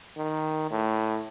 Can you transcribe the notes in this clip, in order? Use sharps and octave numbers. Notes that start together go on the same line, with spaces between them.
D#3
A2